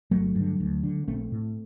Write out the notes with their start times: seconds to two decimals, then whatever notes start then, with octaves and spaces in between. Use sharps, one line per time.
0.11 G1 F#3 A3
0.35 G2 D3
0.60 D2
0.83 D3
1.08 A#1 A3 C4
1.32 A2